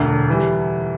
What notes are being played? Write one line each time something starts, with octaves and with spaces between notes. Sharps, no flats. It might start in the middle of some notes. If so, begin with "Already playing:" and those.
Already playing: E1 D2 D3
E3 G3